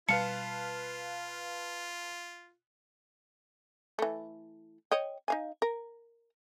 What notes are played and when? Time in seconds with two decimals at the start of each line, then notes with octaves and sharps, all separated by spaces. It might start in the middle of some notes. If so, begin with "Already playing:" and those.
0.09 B2 G3 F4 B4 F5 A5 C#7
3.99 E3 A3
4.91 C#5 D#5 G5
5.28 D#4 F5 G#5
5.62 A#4